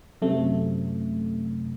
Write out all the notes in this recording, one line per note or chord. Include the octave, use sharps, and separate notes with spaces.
F#2 C3 A3